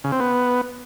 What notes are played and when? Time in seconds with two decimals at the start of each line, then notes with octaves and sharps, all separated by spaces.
0.04 C#3
0.12 C4
0.20 B3